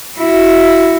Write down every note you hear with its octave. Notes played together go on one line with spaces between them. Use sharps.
E4 F#4